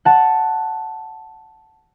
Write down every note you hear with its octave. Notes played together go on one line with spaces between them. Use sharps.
F#5 A5